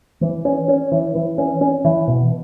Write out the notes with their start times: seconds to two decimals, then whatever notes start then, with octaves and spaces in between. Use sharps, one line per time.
0.21 E3
0.45 C#4
0.68 C#4
0.92 E3
1.15 E3
1.38 C#4
1.61 C#4
1.84 E3
2.08 B2